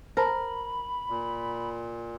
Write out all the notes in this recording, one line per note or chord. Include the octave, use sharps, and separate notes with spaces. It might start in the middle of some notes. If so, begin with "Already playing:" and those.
A#4 C5 A5 B5
A#2